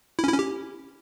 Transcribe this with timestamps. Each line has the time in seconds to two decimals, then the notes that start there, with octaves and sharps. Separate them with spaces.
0.19 E4
0.24 C#4
0.29 E4
0.34 C#4
0.39 G4